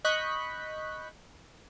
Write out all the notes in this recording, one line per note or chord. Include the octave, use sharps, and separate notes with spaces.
D#5 B5 C#6 F#6 G6 B6